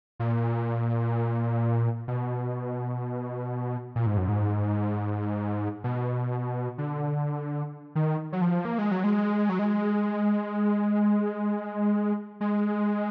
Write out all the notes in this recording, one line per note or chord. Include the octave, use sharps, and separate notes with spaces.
A#2
B2
A#2
G#2
F#2
G#2
B2
D3
D#3
F#3
F3
A#3
G#3
F#3
G#3
F#3
G#3
G#3